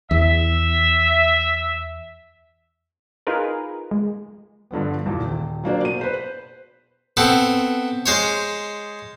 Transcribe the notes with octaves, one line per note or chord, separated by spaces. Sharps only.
E2 E5
D#4 F4 G#4 A#4 B4
G#3
G2 D3 F3 B3
B1 E2 A#2
D#1
F#3 A#3 D4 C5
B2 D#7
B4 C5
B3 C4 A4
G#3 C5 C#5